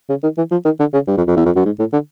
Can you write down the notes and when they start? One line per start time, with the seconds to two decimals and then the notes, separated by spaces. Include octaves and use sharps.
0.09 C#3
0.23 D#3
0.38 E3
0.51 F3
0.65 D#3
0.80 D3
0.93 C#3
1.08 G2
1.17 F2
1.27 F2
1.36 E2
1.46 F2
1.56 F#2
1.65 G#2
1.79 A2
1.93 D3